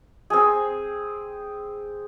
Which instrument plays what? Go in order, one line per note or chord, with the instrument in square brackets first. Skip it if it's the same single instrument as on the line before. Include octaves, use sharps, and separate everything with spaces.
[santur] C4 G#4